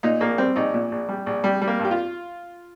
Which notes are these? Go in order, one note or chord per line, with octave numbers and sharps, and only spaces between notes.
A#2 D#4
A#1 A#3
G3 C4
A#1 D#4
A#2
A#1
G3
A#1
G3
G3
A#3
G2
G4
F4